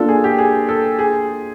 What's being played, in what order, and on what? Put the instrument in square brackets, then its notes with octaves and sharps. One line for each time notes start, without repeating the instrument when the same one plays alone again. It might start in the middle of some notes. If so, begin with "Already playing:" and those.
Already playing: [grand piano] A#3 D4 F4 [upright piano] A4
[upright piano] G#4
G4
G#4
A4
G#4